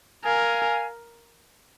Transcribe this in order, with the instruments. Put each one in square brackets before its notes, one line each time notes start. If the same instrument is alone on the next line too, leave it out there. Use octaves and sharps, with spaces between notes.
[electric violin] A#4 [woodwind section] F5 G#5